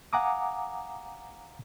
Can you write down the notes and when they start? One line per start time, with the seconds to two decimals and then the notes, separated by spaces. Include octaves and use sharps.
0.13 F5 F#5 G#5 A#5 D6 D#6